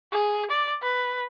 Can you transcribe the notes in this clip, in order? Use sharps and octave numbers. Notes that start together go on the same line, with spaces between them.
G#4
D5
B4